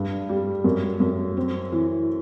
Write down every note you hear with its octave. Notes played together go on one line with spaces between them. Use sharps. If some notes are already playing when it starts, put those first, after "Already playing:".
Already playing: G2
G3
F#2
F#2
C4
E3